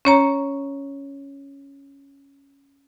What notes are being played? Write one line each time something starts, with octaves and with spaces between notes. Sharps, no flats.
C#4 C#5 A#5